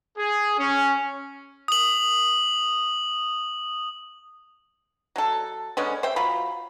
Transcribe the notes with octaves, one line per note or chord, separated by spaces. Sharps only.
G#4
C#4
D#6 F#7
F#3 A4
D3 G#3 B3 C#4
C5 E5 G5
F#3 F4 B5